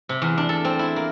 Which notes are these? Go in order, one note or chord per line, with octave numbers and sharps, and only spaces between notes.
C3
E2
D4
A4
C4
E4
A#3